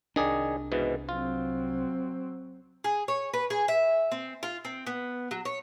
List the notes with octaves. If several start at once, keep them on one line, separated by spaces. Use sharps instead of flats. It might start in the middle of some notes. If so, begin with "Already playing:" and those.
C2 D#3 D4 G#4 D5
G#2 B2 E3
F#3 C4 F4
G#4
C#5
B4
G#4
E5
C4
F4
C4
B3
F#3
C#5